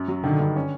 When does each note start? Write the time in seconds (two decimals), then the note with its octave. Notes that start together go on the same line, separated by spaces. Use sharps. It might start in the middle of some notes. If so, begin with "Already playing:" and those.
Already playing: F#2
0.08 F#3
0.24 D3 D#3
0.40 G2
0.56 C#4